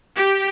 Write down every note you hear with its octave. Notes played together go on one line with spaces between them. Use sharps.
G4